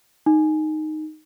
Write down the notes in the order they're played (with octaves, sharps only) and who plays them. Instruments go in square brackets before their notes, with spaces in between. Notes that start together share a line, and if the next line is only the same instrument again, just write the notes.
[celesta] D#4